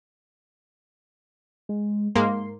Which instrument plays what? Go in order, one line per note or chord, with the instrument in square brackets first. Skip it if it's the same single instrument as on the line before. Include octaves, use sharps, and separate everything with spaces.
[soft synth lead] G#3
[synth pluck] G#2 A#3 [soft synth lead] C6